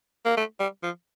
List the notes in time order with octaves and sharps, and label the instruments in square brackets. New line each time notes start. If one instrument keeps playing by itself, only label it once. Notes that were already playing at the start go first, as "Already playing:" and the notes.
[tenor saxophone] A#3
A3
G3
F3